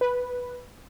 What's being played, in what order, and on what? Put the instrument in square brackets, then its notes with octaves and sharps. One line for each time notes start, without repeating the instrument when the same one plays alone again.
[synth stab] B4